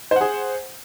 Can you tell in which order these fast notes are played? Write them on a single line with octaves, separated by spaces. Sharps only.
C5 F#5 G#4